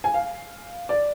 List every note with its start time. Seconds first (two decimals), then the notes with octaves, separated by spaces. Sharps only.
0.04 G#5
0.14 F5
0.89 D5